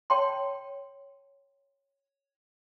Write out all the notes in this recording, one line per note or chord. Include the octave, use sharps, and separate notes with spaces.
C#5 G5 A5 C6